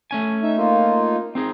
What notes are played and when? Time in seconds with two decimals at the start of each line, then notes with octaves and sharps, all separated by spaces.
0.11 A3 C#4 G#5
0.43 D#4 E5
0.58 A#3 D#4 F4
1.35 C4 D#4 G#4